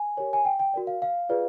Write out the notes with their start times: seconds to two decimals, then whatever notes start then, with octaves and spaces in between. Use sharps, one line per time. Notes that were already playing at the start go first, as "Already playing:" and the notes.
Already playing: G#5
0.17 G4 A#4 C#5
0.33 G#5
0.45 G5
0.59 G5
0.74 F#4 A#4 D5
0.87 F5
1.02 F5
1.29 F4 G#4 B4 D5